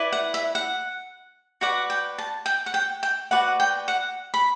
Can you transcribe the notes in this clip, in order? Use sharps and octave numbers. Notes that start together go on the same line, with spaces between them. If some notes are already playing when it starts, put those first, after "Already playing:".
Already playing: E4 B4 D5
F#5
E5
F#5
F#4 B4 D5 F#5
G5
A5
G5
F#5
G5
G5
F#4 B4 D5 F#5
G5
F#5
B5